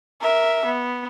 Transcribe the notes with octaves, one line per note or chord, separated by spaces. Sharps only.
A#4 E5
B3